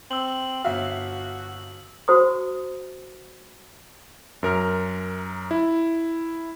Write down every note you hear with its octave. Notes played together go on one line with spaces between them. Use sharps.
C4 E6 F#7
G1 F#4 E5 F5
F#4 C5 A#5 D#6
F#2 A#4 F6
E4